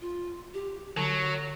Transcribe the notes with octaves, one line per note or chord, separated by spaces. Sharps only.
F4
G4
D3 F#3 C#6